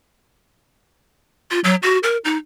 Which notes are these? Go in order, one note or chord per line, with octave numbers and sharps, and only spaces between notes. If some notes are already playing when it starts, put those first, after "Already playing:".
F4
F#3
F#4
A#4
D#4